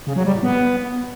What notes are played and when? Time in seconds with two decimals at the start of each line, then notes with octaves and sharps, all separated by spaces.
0.07 C#3
0.16 F#3
0.25 G3
0.34 A2
0.43 B3